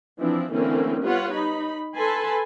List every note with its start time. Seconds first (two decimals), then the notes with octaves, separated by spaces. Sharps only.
0.20 E3 F3 C4 D4 E4
0.52 D3 E3 A3 A#3 C4 C#4
1.03 G3 B3 F4 B4 C#5 F#5
1.33 D#4 B5
1.96 A4 B4 G#5 A5 B5 C6